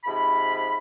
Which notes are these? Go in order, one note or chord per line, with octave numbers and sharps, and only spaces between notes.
G#2 C3 F3 B5